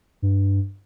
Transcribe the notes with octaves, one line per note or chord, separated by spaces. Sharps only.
G2